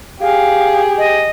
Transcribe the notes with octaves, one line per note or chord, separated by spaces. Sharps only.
G4 G#4 F5
D#5